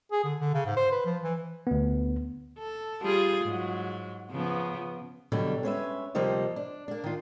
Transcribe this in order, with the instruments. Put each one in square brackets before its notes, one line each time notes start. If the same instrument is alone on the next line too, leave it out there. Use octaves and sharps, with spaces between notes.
[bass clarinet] G#4
D3
D3
C#3
G#2
C5
B4
F3
E3
[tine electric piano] D2 B3
[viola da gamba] A4
G3 F4 G#4
G#2 F#3
C#3 F3 B3
[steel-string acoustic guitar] B2 D3 F#3 G3
G#3 C#4 B4 E5
D2 C3 F3 G3 A#3 D#5
D4
A#3 D4
D#3 F4